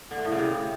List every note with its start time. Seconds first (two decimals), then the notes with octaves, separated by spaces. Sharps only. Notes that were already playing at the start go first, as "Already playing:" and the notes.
0.11 D3
0.18 A3
0.25 A2
0.32 C#3
0.39 C3